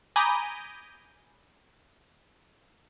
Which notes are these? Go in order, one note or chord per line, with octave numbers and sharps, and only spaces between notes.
G#5 A#5 B5 D6 D#6 G6